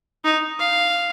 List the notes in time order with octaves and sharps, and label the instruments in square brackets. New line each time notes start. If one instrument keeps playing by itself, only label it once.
[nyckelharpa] D#4
F5